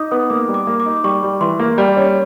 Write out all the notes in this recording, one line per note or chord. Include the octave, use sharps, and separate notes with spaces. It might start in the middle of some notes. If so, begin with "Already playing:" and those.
Already playing: D#4 D6 D#6
B3 D#6
A#3 D6
G3
D6
A#3
D6
D#4
G3 C#6
G3
E3 C6
A#3
G3
C#4